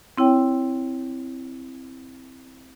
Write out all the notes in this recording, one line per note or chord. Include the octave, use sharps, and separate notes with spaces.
C4 E4 C#5 G5